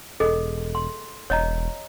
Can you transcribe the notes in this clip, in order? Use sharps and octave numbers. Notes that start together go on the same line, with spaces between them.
E1 G#4 A4 D#5
C6
E1 C#5 D#5 A#5